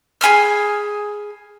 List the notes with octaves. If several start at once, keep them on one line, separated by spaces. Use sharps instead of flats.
G#4 G#5 B5 F6